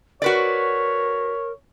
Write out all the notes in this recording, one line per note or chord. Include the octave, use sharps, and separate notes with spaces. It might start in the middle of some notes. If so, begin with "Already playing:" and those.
F#4 A#4 B4 C#5 D5